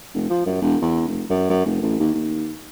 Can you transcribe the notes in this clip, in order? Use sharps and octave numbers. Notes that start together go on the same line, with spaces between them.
F1
F3
F#2
E1
E2
F1
F#2
F#2
F1
A1
D#2
D#2